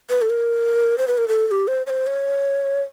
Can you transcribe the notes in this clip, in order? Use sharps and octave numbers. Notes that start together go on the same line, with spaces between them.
B4
A4
A#4
C5
B4
A#4
A4
A4
G4
C5
C#5
C5
C#5